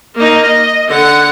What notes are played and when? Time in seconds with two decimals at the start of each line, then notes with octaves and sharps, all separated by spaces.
0.16 A#3 D#4
0.47 D#5
0.89 D3 F#5